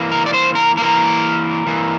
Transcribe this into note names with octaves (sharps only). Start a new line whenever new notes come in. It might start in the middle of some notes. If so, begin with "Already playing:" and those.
Already playing: E3 A#3
A#4
D5
C5
A#4
E3 A#3 A#4
E3 A#3